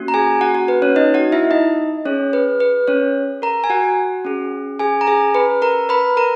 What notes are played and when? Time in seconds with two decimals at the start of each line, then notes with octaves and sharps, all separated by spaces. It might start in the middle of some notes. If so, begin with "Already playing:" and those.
Already playing: A#3 C#4 F#4
0.08 A#5
0.14 G#4 G#5
0.41 F#4 F#5
0.55 F#4 F#5
0.68 B4
0.82 C#4 C#5
0.96 D#4 D#5
1.14 F#4 F#5
1.32 E4 E5
1.51 D#4 D#5
2.05 C#4 G#4 C#5
2.33 B4
2.60 B4
2.88 C#4 C#5
3.42 A#4 A#5
3.64 G#5
3.70 F#4 F#5
4.25 C#4 G#4
4.79 G#4 G#5
5.01 A#5
5.07 G#4 G#5
5.35 B4 B5
5.62 A#4 A#5
5.89 B4 B5
6.17 A#4 A#5